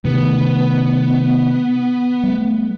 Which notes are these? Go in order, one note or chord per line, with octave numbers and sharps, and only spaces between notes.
C3 D#3 A3 B3
G3 A3